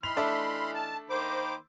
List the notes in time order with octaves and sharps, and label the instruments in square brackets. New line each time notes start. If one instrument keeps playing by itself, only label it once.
[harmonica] E3 D#4 F6 [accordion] B5 C6 [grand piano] F7
[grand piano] A3 D4 E5
[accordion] A5
[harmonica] D#3 A#3 B5 [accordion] C5 D6